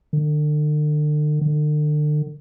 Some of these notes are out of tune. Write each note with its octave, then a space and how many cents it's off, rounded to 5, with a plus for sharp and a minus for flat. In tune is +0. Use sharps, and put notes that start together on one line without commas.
D3 +40
D3 +40